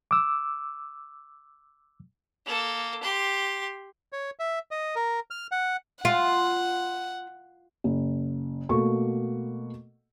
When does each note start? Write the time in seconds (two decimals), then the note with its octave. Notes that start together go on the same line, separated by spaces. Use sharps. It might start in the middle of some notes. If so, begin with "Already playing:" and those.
0.11 D6 E6
2.46 A#3 A4
3.03 G4 C6
4.13 C#5
4.39 E5
4.71 D#5
4.96 A#4
5.31 F6
5.52 F#5
6.05 F4 F#5
7.84 F#1
8.69 B2 A3 A#3 A4 C#6